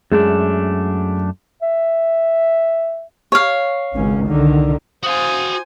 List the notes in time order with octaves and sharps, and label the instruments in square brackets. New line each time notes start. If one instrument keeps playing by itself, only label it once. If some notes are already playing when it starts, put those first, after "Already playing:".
[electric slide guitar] F#2 A3 D4 [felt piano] G#3
[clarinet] E5
[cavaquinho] C#5 F5
[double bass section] G#1 C#2 C#4
C2 D3 D#3
[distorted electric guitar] F#4 F5 [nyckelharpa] C5 G#5 [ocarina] D#6